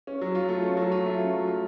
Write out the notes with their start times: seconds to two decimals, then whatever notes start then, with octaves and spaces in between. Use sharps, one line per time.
0.07 C#4
0.21 F#3
0.35 F4
0.49 A3
0.63 C#4
0.77 F#3
0.92 F4
1.06 A3
1.19 C#4
1.33 F#3
1.48 F4